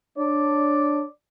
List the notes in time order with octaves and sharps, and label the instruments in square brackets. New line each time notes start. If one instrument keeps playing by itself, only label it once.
[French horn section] D4 C#5 [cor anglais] D5